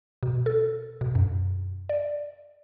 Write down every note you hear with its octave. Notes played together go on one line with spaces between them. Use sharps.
B2
A4
B2
F#2
D5